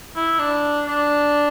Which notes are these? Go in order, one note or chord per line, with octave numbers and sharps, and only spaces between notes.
E4
D4
D4